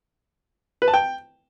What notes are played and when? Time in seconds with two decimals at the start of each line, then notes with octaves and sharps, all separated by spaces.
0.82 B4
0.88 A5
0.94 G5